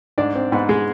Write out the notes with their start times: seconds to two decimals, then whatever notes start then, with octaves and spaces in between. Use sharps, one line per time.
0.18 G#2 D4 D5
0.35 C4
0.52 G#2 B3 B4
0.69 G#3 G#4